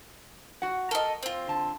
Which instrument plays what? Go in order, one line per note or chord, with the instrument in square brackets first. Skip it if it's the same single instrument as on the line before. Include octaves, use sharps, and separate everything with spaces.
[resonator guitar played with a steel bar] F#4 F#5
[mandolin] A4 D#5 [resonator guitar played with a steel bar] A#4
[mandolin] C4 F4
[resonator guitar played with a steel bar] D3 A5